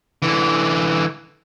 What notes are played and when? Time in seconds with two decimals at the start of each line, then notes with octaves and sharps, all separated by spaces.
0.22 D3 E3